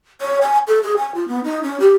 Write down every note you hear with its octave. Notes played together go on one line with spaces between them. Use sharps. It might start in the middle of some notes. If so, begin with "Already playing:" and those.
C#5
G#5
A4
G#4
G#5
F4
B3
D#4
C#4
G4